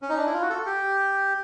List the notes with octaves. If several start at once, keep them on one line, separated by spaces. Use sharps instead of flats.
C#4
D#4
D4
E4
F4
F#4
A4
G4